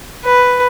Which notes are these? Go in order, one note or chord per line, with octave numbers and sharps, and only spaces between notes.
B4